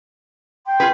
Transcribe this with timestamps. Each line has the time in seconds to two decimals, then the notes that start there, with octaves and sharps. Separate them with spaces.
0.66 G5 C6
0.80 F4 G#4 B4